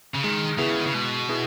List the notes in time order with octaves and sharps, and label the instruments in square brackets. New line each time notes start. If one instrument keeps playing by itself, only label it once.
[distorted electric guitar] C#3
[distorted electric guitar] D#3 [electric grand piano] G#3
[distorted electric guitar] C#3 [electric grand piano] B3 E4 G#4
[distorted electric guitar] D#3
C#3
[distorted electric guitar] B2 [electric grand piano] G#3
[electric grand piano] B3 E4 G#4